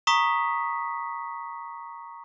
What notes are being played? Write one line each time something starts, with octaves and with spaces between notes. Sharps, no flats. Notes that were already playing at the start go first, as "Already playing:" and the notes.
A#5 C#6 D#6 B6